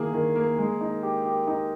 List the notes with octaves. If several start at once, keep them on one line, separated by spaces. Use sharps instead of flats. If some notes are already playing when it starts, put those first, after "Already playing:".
Already playing: D#3 A#3 E4 G#4
D#3
A#3
G#3
D#4
G4
G4
D#4